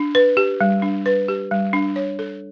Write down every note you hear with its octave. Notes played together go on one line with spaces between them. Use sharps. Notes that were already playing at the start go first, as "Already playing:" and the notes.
Already playing: D4
B4
G4
G3
D4
B4
G4
G3
D4
C#5
A4